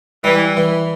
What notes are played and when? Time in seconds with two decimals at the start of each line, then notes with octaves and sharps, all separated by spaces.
0.24 E3 G3
0.57 E3